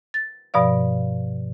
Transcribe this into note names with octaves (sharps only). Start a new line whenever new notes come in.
A6
G2 B2 F3 D5 F5